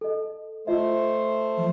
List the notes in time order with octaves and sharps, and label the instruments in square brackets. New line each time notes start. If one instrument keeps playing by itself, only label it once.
[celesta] A4 D#5
[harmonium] A3 C5 [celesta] F4 D#5 E5
[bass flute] F3